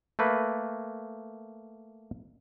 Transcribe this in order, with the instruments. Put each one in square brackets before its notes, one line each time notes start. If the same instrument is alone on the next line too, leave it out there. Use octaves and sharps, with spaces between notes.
[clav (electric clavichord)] A3 A#3 B4